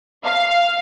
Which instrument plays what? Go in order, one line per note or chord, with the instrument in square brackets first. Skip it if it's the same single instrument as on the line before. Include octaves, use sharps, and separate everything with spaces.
[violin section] F5